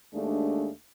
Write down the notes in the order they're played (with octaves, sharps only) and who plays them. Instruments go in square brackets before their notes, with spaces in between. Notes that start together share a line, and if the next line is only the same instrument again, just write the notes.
[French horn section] D#2 G#3 A3 D4